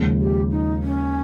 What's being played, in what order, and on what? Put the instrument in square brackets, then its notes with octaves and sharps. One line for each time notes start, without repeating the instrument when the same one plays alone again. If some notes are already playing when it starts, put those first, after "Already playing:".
Already playing: [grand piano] D#2 C#3 F3 G#3
[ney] G4
D#4
C#4